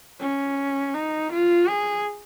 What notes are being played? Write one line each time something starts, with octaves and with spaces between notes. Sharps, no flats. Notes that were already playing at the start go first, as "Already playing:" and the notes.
C#4
D#4
F4
G#4